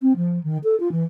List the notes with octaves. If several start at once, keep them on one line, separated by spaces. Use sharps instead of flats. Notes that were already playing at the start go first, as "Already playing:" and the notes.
C4
F3
D#3
A4
F4
E3